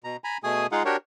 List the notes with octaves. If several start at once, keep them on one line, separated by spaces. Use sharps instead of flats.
B2 A#5
G#5 A#5 B5
B2 A3 G#4 G#5 D#6
G#3 D#4 F4 G#4 F5 F#5
D4 F#4 G4 A#4 C#5